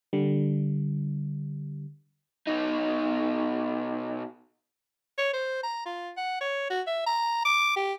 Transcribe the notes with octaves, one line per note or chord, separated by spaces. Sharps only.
D3 G3
B2 D#4
C#5
C5
A#5
F4
F#5
C#5
F#4
E5
A#5
D6
G4